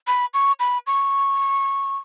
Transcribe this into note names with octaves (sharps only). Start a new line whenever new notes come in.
B5
C#6
B5
C#6